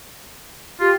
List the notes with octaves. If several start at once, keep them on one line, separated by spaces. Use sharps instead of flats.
F4 G4